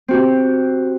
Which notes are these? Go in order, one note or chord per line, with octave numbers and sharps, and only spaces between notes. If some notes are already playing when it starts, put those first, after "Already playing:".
C4 F#4 G4